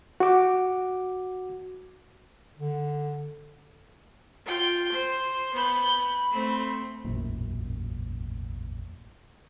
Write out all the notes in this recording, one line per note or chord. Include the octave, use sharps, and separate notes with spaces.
F#4 D6
D3
F4 G5
C5
B3 B5 G6
A3 C4
E1 A1 F#2 A#2